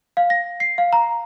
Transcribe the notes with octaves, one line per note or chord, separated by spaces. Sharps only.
F5
A#6
C7
F5
A#5